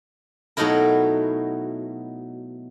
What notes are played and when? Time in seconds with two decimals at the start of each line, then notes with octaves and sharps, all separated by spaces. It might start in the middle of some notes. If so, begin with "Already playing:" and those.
0.57 B2 F#3 A3 D#4 E4 A#4